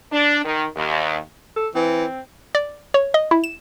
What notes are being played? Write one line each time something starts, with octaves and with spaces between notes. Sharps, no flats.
D4
D#3
D#2
A4
E3 C4
D5
C#5
D#5
E4
E7